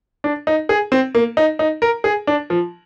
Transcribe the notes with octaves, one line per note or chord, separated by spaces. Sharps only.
D4
D#4
G#4
C4
A#3
D#4
D#4
A#4
G#4
D4
F3